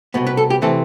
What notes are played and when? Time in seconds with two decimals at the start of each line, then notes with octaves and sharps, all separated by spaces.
0.14 C2 B2 B3
0.27 B4
0.37 A4
0.50 G4
0.62 C3 E3 A3 C4 A4